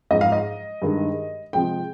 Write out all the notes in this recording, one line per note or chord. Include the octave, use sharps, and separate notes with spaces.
G#2 F3 G#3 D#5
F5
D#5
G2 D#3 G#3
C3 F3 G#3 G5